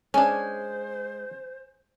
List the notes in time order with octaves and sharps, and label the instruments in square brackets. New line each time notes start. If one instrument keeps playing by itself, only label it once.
[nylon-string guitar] G#3 [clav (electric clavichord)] C#4 D4 [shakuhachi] C5 [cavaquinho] G#5